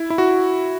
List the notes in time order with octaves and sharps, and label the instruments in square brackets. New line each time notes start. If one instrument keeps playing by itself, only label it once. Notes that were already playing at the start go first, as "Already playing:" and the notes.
Already playing: [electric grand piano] E4
E4
F#4